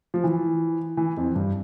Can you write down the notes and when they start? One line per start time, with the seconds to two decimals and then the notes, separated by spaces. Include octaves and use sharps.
0.14 F3
0.24 E3
0.97 E3
1.17 F2
1.35 G2